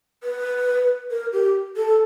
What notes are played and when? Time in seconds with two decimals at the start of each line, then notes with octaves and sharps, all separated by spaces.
0.24 B4
1.11 A#4
1.33 G4
1.76 A4